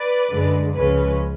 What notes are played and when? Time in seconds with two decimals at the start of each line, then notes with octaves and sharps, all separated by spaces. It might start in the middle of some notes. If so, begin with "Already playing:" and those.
Already playing: B4 D5
0.29 F#2 D3 G#3
0.74 C#2 C#3 F3 G#3 C#4 B4